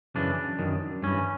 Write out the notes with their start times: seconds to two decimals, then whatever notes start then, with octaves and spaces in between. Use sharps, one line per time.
0.15 F#2 C#3 E3 D4
0.59 F#2 D#3
1.03 G2 E3 C#4